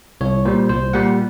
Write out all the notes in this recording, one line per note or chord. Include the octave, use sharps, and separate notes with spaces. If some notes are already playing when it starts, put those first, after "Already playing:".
C2 C#5
A#2 G3 C5
C2 C5
A#2 G3 F#5